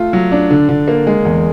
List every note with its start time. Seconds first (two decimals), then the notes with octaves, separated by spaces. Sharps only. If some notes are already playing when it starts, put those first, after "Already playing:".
Already playing: A3 F4
0.13 F#3
0.32 D4
0.50 D3
0.69 D3
0.88 A#3
1.07 G#3
1.25 E2